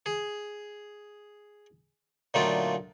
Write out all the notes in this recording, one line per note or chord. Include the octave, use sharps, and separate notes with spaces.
G#4
A#2 D3 F#3 A3 D#4 F4